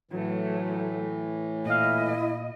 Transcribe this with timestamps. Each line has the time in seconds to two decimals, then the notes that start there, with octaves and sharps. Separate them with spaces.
0.11 A2 E3 F#3 A3
1.66 A#2 E4 D#5 F5